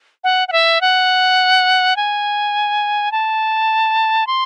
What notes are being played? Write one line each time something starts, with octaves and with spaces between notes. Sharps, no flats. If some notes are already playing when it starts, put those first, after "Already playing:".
F#5
F#5
E5
F#5
G#5
A5
C6